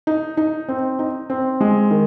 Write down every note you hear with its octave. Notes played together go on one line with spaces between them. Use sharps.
D#4
D#4
C4
D#4
C4
G#3
D#3